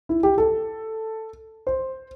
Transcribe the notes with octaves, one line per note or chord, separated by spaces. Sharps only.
E4
G4
A4
C5